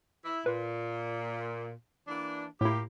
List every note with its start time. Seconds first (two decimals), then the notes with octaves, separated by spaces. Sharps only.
0.25 E4
0.46 A#2 B4
2.08 E3 A#3 D4
2.61 A2 A#3 E4 F4 G4